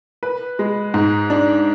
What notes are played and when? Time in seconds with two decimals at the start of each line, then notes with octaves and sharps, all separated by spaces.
0.23 B4
0.59 G#3
0.94 G#2
1.30 D4